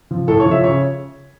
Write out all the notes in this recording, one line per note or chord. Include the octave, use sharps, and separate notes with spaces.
F3
A2 A4
C#5
F3
E5
C#3 C#5